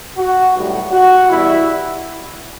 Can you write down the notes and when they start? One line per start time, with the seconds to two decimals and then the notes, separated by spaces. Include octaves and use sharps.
0.17 F#4
0.55 B1 A2 G3
0.92 F#4
1.29 E2 B2 G3 E4